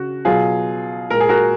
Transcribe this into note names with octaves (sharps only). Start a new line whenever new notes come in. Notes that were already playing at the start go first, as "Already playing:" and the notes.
Already playing: C#3 F#4
B2 F#3 F4 G#4
A#2 G#3 A#4
G#4
F#4 A#4